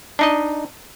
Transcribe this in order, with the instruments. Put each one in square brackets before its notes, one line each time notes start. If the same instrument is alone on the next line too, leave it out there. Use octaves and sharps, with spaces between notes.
[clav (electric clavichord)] D4 D#4 D#5